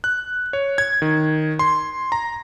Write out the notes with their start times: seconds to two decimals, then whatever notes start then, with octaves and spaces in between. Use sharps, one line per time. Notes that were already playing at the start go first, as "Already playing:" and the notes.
0.04 F#6
0.53 C#5
0.78 G#6
1.02 D#3
1.59 C6
2.12 A#5